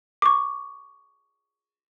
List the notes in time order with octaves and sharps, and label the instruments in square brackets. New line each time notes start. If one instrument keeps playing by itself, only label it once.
[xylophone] C#6 D6